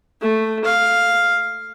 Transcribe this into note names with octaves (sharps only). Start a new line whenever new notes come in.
A3
F5